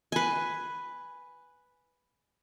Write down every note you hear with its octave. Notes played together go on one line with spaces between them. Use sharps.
B4 G#5